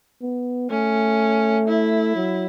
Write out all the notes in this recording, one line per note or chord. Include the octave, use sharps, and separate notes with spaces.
B3
A3 C#4
E4
F#3